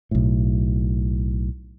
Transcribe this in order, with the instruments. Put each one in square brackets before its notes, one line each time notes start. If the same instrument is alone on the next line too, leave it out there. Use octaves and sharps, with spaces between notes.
[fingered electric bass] B1 A2